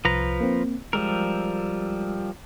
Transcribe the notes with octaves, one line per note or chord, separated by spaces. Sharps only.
C2 F3 B4 A#5
A#3 C4
F3 G3 G#3 A#4 E6